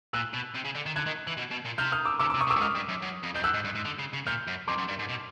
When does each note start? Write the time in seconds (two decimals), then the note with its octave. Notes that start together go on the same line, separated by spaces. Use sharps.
0.13 A#2 E6 F#6
0.33 B2
0.55 C3
0.64 C#3
0.75 D3
0.86 D#3
0.96 D3 F#6 G#6
1.06 D#3
1.27 E3
1.37 B2
1.51 B2
1.65 A#2
1.78 C3 F6 G6
1.92 D#6 F6
2.05 D6 E6
2.19 C#3 D6 E6
2.30 C3 D6 E6
2.41 C#6 D#6
2.47 B2
2.50 D6 E6
2.56 G2
2.61 G#2 D#6 F6
2.75 G2
2.89 F#2
3.02 F#2
3.23 F2
3.35 F2 G6
3.43 F#2 E6 F#6
3.54 G#2
3.64 G2
3.75 G#2
3.85 D3
3.99 C#3
4.13 C#3
4.26 A#2 F6 G6
4.47 F#2
4.68 F2 C6 D6
4.78 F#2
4.88 G2
4.99 G#2
5.09 B2